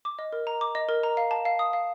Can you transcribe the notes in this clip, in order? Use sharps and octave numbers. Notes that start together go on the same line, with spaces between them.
D6
D#5
A#4
A#5
D6
D#5
A#4
A#5
F5
A5
F5
D#6
F5